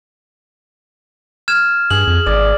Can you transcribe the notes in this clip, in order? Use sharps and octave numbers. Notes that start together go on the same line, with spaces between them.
F6 G#6 E7
G2 G#4 F#7
F2
G#1 D5